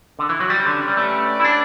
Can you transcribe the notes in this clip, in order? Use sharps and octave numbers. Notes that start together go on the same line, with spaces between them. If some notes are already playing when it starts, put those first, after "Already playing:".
D3
E3
F#3
G3 C#4 G4 B4 D5
D3
G3
A3
E4
D4